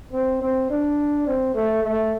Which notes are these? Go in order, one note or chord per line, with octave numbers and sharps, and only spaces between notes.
C4
C4
D4
C4
A3
A3